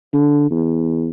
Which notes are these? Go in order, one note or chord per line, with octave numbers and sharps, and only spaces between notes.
D3
E2